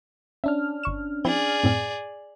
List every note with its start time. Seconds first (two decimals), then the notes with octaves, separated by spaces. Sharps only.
0.44 C#4 D4 E5 F6
0.83 G1 C#6 E7
1.25 F3 C4 E4 G#4 D5
1.63 F#2 A2 C4